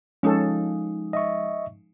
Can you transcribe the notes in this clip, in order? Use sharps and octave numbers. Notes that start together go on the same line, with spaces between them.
F3 G#3 C#4 D#4 A4
D#5 E5 C#6